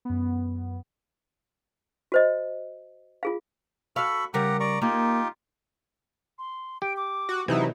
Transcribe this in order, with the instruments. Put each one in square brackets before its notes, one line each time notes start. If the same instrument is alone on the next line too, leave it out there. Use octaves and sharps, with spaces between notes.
[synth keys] F#2 B3
[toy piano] F#4 C5 D#5
F4 G#4 F5
[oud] F#4 F5 [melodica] A4 B5 C#6
[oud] C#3 G3 A#4 [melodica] G4 F#5 A#5
[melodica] D5 A#5 C#6
[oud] A#3 [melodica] D#4 F4 G4
[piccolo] C6
[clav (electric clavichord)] G4 [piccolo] D7
[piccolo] D6
[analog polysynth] F#4
[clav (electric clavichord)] C3 E3 [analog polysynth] F#3 D#4 E4